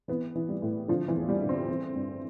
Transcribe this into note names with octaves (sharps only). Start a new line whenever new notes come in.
E3 B3
E3
G3
A2
D3 F3
E3
E2
G3
D3
C4
E3
G2